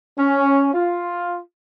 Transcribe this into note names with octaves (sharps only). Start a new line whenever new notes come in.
C#4
F4